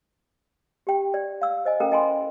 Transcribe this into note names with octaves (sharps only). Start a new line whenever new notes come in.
G4 G5
D5
F5 E6
C5 D#5 G#5
C#4 A4 A#4 F5 G5 A#5
E4 D#5 G5 G#5 B5 C6